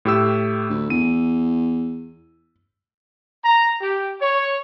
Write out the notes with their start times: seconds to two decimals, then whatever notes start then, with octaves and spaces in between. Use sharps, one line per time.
0.05 A2 G4 E6
0.70 D2
0.90 E2 D#7
3.44 A#5
3.81 G4
4.20 C#5